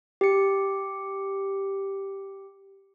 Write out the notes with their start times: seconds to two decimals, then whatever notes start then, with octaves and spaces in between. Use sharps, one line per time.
0.21 G4 C#7